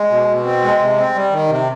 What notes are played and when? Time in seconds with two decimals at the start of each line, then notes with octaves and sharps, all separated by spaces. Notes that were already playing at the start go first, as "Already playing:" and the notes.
Already playing: G#3
0.10 B2
0.28 B2
0.45 C4
0.63 G#3
0.79 C3
0.97 C4
1.14 G3
1.31 D#3
1.48 C3